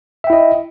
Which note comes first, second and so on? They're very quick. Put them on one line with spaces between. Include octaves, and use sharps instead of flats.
E5 G5 E4 D#5